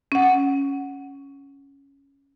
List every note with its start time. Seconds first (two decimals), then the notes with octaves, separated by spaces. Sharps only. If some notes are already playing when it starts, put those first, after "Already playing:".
0.12 C#4 F#5